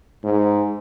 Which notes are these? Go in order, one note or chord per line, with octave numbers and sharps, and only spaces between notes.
G#2